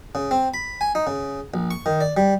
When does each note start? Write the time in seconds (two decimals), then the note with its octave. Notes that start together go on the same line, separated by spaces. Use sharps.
0.15 C#3
0.31 C4
0.54 B5
0.81 G#5
0.95 D#4
1.07 C#3
1.54 A#1
1.71 C#6
1.86 D#3
2.01 D5
2.17 G3